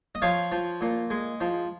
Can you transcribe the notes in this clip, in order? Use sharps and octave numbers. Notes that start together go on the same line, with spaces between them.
D#5
F3 C#5 F5
F3
A#2
G#3
F3